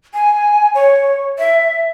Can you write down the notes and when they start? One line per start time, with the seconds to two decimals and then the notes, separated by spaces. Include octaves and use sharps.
0.14 G#5
0.75 C#5
1.39 E5